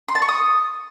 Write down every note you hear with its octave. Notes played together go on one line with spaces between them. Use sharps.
C6
A5
C#6
D#6